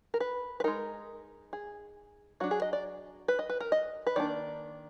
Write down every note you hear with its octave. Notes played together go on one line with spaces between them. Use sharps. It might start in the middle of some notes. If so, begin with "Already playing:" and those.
A#4
B4
B4
G#3 D#4 A#4
G#4
F#3 D4 F#4
G#4
D#5
D5
B4
D#5
B4
A#4
D#5
B4
D#3 A#3 D4 D5